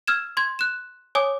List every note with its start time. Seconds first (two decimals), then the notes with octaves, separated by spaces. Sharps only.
0.07 E6 F6 G#6 E7
0.37 C6 G#6
0.59 F#6 E7
1.15 C#5 G#5 D6 D#6